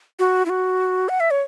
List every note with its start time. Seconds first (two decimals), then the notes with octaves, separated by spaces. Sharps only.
0.19 F#4
0.46 E4
0.49 F#4
1.09 F#5
1.20 E5
1.31 C#5